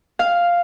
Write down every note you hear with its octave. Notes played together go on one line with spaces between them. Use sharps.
F5